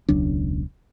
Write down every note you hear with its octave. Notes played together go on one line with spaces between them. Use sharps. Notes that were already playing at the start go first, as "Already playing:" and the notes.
E1 C#2 F#3 D4